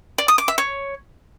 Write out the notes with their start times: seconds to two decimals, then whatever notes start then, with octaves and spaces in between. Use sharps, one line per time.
0.18 D5
0.28 D#6
0.38 D6
0.48 E5
0.58 C#5